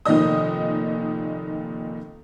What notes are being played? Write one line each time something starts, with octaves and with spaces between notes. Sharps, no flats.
F1 A#2 D#3 D#4 D#5 D#6